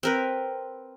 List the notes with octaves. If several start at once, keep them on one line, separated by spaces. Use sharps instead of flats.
C4 A#4 B4